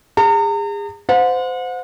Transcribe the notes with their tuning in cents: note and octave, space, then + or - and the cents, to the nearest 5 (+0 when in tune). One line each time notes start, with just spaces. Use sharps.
G#4 -35 A#5 -40
C5 -25 F#5 -40